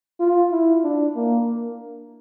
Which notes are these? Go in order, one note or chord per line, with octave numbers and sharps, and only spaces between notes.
F4
E4
D4
A#3